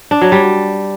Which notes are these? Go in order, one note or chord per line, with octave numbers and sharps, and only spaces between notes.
D4
F#3
G3